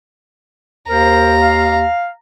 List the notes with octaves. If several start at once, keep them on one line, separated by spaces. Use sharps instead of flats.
D#2 A#4 C5 A#5
F5